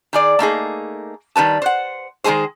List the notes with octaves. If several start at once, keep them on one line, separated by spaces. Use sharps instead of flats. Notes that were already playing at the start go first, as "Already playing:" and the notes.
D#3 G#4 D5
A3 A#3 D#4 G#4
D#3 G3 B4 A5
C5 F#5
D#3 F3 G#3 G#4 C5